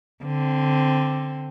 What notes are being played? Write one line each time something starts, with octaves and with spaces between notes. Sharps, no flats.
D3 C4